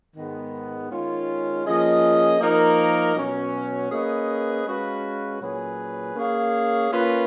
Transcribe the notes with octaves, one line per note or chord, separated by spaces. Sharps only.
G#2 D#3 G#3 B3
D#3 G#3 C#4 F4
F3 A#3 C#4 G#4 D#5
F3 A#3 D#4 A#4
B2 F#3 C#4
A#3 C#4 G#4 B4 D#5
G#3 C#4 F#4 B4 F5
A#2 F#3 C#4 G#4 B4
A#3 C#4 G#4 C#5 F5
A#3 C#4 F4 B4